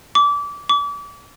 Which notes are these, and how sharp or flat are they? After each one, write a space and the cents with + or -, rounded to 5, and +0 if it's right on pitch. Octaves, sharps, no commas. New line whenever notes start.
D6 -25
D6 -35